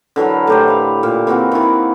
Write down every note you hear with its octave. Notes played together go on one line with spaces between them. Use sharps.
D3 E3 F#3 A#4
A2 G4 C5
B4 F5
A#2
E3 A#3 C4 F#4
D#3 E3